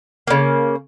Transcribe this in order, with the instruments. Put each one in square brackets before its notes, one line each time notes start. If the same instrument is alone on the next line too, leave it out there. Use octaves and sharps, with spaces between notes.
[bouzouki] C#3 A#3